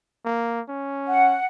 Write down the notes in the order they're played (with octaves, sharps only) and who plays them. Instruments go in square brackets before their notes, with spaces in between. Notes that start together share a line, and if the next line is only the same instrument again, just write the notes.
[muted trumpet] A#3
C#4
[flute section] F#5